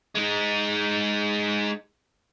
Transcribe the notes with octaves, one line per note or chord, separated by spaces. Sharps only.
G#3 D#4